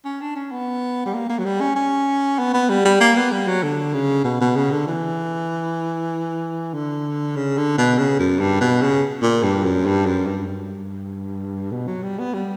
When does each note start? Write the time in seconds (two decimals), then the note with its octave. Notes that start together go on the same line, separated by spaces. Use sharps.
0.05 C#4
0.21 D4
0.36 C#4
0.52 B3
1.06 G3
1.14 A#3
1.29 A#3
1.39 F#3
1.45 G3
1.61 C#4
1.76 C#4
2.39 B3
2.53 B3
2.69 G3
2.85 G3
3.00 A#3
3.16 B3
3.32 G3
3.47 F#3
3.63 D3
3.93 C#3
4.24 B2
4.41 B2
4.56 C#3
4.71 D3
4.87 E3
6.73 D3
7.36 C#3
7.57 D3
7.78 B2
7.98 C#3
8.19 F#2
8.39 G2
8.61 B2
8.81 C#3
9.22 A#2
9.43 G2
9.64 F#2
9.86 G2
10.06 F#2
10.27 G2
10.47 G2
11.71 B2
11.87 F#3
12.03 G3
12.19 B3
12.34 G3